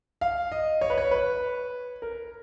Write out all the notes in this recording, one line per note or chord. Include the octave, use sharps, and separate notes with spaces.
F5
D#5
C#5
B4
C#5
B4
A#4